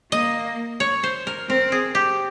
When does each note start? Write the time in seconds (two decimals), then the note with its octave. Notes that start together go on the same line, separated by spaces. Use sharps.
0.12 A#3 D#5
0.80 C#5
1.03 C5
1.27 A#4
1.49 C4 A#4
1.72 G#4
1.95 G4